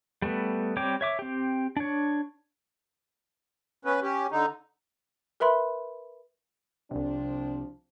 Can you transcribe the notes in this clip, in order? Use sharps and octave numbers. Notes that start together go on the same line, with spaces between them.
G3 A3 B3
G3 C4 C#5 G5 D6
C#5 E5 D6
C4 G4
D4 C#5
B3 C#4 B4
C#4 G4
D3 D#4
A#4 B4 E5 B5 C6
C2 C3 F3 C4 D4